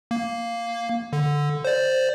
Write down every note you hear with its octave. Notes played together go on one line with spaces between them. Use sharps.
A#3
D3
C5 D5